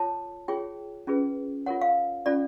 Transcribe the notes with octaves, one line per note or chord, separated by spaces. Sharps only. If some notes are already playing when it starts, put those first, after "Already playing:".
Already playing: F4 A4 C#5 A5
F4 G#4 C#5 G5
C#4 F4 G#4 B4
F4 A#4 C#5 F#5
F5
C#4 F4 A4 D5